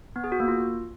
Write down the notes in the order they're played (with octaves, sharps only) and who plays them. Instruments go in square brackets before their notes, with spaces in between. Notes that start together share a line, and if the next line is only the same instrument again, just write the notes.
[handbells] B3
G#4
F#4
A#3
F4